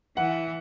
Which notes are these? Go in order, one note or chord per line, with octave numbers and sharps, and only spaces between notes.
E3 F#5